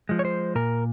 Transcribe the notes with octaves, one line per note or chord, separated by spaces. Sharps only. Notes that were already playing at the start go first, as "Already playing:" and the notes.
F3 G#3
C#5
C5
A#2 A#4